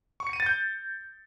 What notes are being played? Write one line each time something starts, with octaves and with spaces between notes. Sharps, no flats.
C#6
C#7
D#7
A6
G6